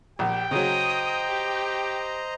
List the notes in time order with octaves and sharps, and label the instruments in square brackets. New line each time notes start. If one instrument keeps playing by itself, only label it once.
[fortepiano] A#1 [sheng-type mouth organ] G4 [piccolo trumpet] G5
[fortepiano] C#3 F#3 [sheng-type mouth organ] C5 D#5 A#5 [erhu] D#6
[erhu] G4